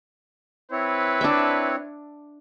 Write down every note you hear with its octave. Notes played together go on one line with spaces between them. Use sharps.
C4 E4 B4 C#5
D4 E5